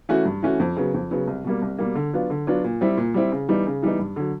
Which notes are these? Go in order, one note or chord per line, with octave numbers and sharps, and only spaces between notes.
E3 A3 C#4 F#4
G2
E3 A3 C#4 F#4
F2
C#3 F#3 B3
F2
C#3 F#3 B3
C2
B2 G3 A#3
C2
B2 G3 A#3
D3
F#3 B3 D4 F4
D3
F#3 B3 D4 F4
A#2
G3 C4 E4
A#2
G3 C4 E4
C#3
E3 G3 B3 D#4
C#3
E3 G3 B3 D#4
G2
D3 F#3